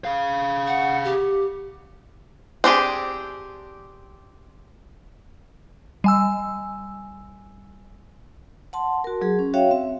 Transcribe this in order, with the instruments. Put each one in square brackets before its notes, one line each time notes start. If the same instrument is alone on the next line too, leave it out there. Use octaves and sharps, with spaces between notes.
[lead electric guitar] G#4 F5
[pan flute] F#5
G4
[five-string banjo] C4 D4 G4 G#4
[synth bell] G3 G#5 E6
[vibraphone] F#5 A5 C6
F#4 A#4
F#3 G#4
C#4
F#4 C#5 E5 F5 G5
C4 E5